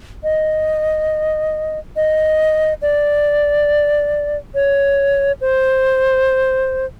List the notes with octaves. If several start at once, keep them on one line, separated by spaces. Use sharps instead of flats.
D#5
D#5
D5
C#5
C5